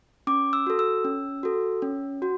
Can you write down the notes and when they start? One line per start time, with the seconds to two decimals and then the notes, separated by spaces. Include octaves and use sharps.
0.27 C#4 D6
0.53 E6
0.67 F#4 A4
0.79 E6
1.05 C#4
1.43 F#4 A4
1.82 C#4
2.22 F#4